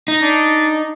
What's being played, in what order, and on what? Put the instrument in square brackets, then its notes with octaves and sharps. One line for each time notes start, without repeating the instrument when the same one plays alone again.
[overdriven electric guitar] D#4
[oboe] D4